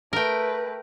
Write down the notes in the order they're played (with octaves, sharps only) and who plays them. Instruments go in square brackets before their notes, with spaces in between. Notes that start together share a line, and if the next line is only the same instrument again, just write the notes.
[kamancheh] A3 B4 [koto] A#4 G5